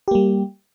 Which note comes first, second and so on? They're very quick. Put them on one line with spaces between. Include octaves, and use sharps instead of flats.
G4 A#3 G3